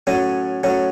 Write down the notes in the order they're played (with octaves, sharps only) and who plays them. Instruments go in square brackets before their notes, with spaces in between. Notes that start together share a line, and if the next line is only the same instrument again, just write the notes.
[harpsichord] A2 F#3 C#4 G#5
A2 F#3 C#4